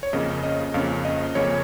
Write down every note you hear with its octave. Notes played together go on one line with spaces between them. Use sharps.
C#5
F2 C#3 A#3 C#4 D#5
D#5
F2 C#3 A#3 C#4 F5
D#5
F2 C#3 A#3 C#4 C#5